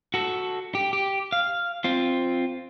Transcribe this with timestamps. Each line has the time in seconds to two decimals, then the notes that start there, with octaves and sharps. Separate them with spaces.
0.14 F#4 A4
0.75 G4
0.93 G4
1.32 F5
1.84 C4 F4